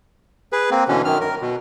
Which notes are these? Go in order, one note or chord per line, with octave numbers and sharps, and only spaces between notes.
G#4 B4
A#3 C4
B2 D3 E3 C#4
F#2 D#3 F6
A#4
B2